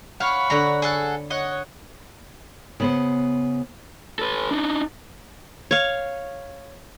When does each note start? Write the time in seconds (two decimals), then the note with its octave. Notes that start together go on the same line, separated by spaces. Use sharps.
0.20 C#5 F5 F#5 B5 C#6
0.50 D3 C#5 F#5 A#5 C6
0.82 G#4 A4 F#5
1.30 C#5 D#5 F#5
2.80 C#3 B3 C5
4.19 A4 B4
4.51 D4 D#4
5.71 C#5 F5